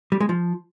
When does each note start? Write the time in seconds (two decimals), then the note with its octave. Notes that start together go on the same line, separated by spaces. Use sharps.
0.12 G3
0.20 G#3
0.29 F3